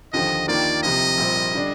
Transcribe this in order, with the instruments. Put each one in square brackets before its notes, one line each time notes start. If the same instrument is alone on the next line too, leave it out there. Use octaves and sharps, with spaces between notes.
[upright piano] D#2 D3 F3 [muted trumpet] D#5
[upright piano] D#2 D#3 A#3 D4 F4 [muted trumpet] D5
[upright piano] C2 C3 F3 [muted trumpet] D#5
[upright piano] A#1 A#2 G3 C4
D3 G3 D4